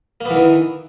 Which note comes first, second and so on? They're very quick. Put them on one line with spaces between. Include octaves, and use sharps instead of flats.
A#3 B3 E3 D#3